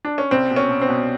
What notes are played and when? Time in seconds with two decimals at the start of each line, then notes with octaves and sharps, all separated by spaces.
0.05 D4
0.18 C#4
0.31 C2 C4
0.50 B2
0.56 C#4
0.69 B2
0.82 C4
0.89 B2